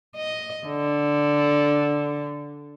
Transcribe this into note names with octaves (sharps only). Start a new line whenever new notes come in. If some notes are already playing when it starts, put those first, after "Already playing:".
D#5
D3